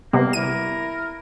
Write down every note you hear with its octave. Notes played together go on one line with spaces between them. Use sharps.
C3 G3 A#3 B3
E4 A#4 D#7